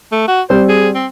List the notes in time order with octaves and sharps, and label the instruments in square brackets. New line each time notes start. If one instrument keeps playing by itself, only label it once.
[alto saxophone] A3
F#4
[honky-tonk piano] G3 C4 [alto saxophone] C5
[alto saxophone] G#4
C4